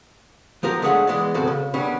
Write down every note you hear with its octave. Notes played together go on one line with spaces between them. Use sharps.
F3 B3 G4 A#4
G#3 A3 C#4 D4 C#5 F#5
E3 G#3 B3 D5
B1 F#2 C#3 C4 F#4 A4
C#3
D#3 G3 B3 C#4 D4